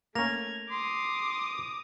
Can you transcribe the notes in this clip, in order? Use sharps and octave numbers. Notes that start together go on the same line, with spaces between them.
A3 A#3 C#4 G#6 A#6 F7
C6 D6 D#6